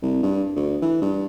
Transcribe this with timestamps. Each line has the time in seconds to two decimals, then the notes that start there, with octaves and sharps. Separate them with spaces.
0.02 C2
0.23 G2
0.56 D2
0.82 E3
1.02 G2